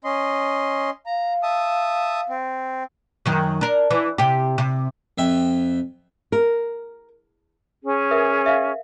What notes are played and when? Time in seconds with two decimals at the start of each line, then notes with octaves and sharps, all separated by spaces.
0.04 C#4 D#5 C6
1.06 F5 A#5
1.43 E5 A5 D#6
2.29 C4
3.26 F#2 D#3 F#3
3.61 D4 A#4
3.91 E3
4.18 C3 G4
4.58 C3
5.18 F2 E5 G5
6.32 A#4
7.83 C#4 G#4
8.11 A#4 B4 E5
8.46 E5 F5